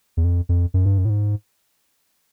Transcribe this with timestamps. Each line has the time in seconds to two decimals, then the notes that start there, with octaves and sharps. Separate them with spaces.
0.17 E2
0.24 F2
0.49 F2
0.74 F#2
0.86 G2
0.98 F#2
1.05 A2
1.10 G#2